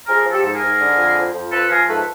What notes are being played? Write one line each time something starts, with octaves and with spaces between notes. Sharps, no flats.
F3 G#4 A#4
F3
G4 A4
G#2
G#4 A#4
G#2
D3
F2
F3
F2
F3 A4 B4
F3 G#4 A#4
G#2 A4 B4